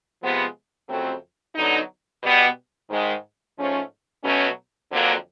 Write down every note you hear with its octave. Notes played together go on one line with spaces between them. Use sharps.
C3 F3 G#3 B3
F2 C#3 F#3 A3 C4
D3 F#3 B3 D#4
B2 G3 B3
G#2 D#3 G#3
G#2 F3 A3 C#4
B2 F#3 A3 C#4
F2 D3 F#3 A#3